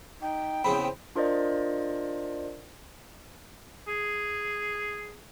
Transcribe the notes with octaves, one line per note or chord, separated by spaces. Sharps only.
D#4 G5
E2 C#3 C4 C5 B5
D4 F4 A#4 C5 D5 D#5
G#4